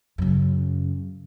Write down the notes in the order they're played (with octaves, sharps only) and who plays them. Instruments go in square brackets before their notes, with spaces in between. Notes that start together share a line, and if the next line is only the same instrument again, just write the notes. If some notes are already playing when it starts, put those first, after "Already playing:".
[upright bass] F#2 C#3